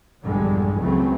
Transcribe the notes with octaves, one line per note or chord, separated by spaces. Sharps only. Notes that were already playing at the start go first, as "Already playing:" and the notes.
A#1 E2 G2 D3 G3 G#3
C#2 C#3 E3 F#3 A3 C4